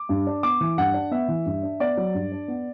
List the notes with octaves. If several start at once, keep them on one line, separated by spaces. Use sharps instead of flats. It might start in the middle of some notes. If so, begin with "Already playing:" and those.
Already playing: D6
G2
D4
B3 D6
E3
G2 F#5
D4
B3 E5
E3
G2
D4
B3 D5
F#3
G2
D4
B3